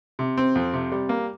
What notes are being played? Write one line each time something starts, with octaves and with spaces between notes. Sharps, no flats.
C3
C4
F2
C3
G3
A#3